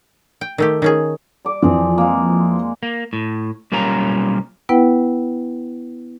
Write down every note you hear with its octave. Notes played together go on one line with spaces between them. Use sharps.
G5
D#3 A3 G4
D#3 C#4 G#4
G3 D6
F2 E3 F3 C4 G#4
G#3 A#3
A#3
A2
B1 G3 A#3 C#4 F4 A#5
B3 E4 B4 F#5 G5